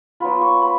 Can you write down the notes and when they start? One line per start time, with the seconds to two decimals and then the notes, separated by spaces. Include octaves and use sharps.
0.20 F#3 B3 F4 B5
0.41 C#6
0.61 B5